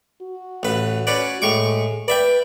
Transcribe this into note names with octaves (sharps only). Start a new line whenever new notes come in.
F#4
A1 B4
C#4 B4 D5
A2 G#3 C#6 D6
B4 D5 E5 G5